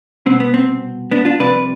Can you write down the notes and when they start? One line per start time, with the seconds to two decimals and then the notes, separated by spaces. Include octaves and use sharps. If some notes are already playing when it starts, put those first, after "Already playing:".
0.26 C2 B2 C4
0.40 B3
0.54 C4
1.11 B3 D4
1.25 D4 F4
1.39 C2 C3 F3 B4 D5